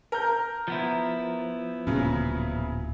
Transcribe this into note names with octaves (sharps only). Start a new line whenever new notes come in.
A#4 G6
F3 B3 E4
D1 A#2 C#3 F#3